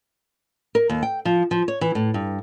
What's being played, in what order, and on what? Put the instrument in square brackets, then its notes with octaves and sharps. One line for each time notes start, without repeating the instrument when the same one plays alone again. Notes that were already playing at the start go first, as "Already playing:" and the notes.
[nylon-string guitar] A#4
D#2
G5
F3
F3
C#5
E3
A2
G2